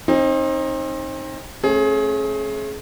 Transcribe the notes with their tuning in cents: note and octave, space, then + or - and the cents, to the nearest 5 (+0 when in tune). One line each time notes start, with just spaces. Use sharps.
C4 +35 D#4 +0
A3 +0 C#4 -40 G#4 +25